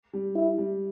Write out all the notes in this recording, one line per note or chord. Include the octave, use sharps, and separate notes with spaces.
G3
E4
G3